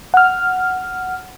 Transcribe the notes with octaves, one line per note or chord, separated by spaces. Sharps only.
F#5 F6